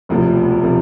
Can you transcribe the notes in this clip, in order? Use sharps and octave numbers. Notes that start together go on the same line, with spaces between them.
E1 D2 C3 F3
C3 F3